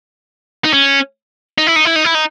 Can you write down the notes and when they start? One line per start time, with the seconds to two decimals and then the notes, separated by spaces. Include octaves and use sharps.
0.65 D#4
0.73 C#4
1.58 D#4
1.67 E4
1.76 D#4
1.85 E4
1.96 D#4
2.05 E4
2.15 D#4